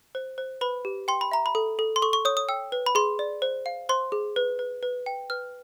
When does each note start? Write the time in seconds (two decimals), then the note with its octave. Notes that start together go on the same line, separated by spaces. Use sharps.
0.15 C5
0.38 C5
0.61 B4 B5
0.85 G4
1.08 G5 C6
1.21 B5
1.31 E5 A#5
1.46 B5
1.55 A4
1.79 A4
1.96 C6
2.02 A4 C#6
2.13 C#6
2.25 C#5 D#6
2.37 D#6
2.49 G5 E6
2.72 B4
2.86 B5
2.95 G#4 C6
3.19 D5
3.42 C5
3.66 F5
3.89 C5 C6
4.12 G#4
4.36 B4
4.59 B4
4.83 B4
5.06 G5
5.30 B4 F6